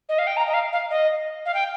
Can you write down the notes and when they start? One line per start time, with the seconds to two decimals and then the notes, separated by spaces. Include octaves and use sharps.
0.09 D#5
0.18 F5
0.27 G5
0.37 A#5
0.47 D#5
0.54 F5
0.72 F5
0.90 D#5
1.45 F5
1.54 G5